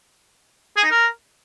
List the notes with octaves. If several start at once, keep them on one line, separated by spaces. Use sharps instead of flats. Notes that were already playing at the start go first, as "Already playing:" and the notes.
G#4
D#4
A#4